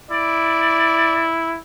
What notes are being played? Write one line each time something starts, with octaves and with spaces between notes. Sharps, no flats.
E4 D5